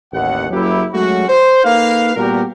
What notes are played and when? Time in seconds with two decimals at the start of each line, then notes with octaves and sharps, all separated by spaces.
0.13 A1 D#2 F#5
0.51 F#1 F#3 E4 G4
0.94 F#3 G#3 A3 C#4 F#4
1.29 C5
1.64 A#3 D#4 A4 B4 F5
2.16 A#2 G3 B3 F#4 G4 A#4